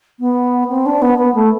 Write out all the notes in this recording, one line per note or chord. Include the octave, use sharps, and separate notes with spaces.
B3
C4
D4
B3
B3
A3